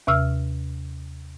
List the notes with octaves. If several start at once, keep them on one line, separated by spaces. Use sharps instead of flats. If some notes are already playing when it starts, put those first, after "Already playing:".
D#2 C3 E6 F6